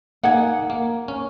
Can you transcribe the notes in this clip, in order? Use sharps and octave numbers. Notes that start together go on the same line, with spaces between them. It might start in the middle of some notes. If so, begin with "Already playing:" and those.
A#3 D#4 F#5 G#5
A#3
C#4